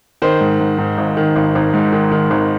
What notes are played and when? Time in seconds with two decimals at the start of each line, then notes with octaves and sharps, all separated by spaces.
0.22 D#3 C5
0.41 G#2
0.60 G#2
0.78 G#2
0.98 G#1
1.17 D#3
1.36 G#1
1.55 G#1
1.74 G#2
1.92 D#3
2.11 D#3
2.30 G#1